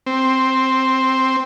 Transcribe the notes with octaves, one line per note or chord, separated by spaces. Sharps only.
C4